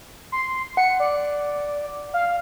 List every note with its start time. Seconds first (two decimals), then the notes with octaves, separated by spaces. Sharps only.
0.32 C6
0.77 F#5 C#7
1.00 D5
2.14 F5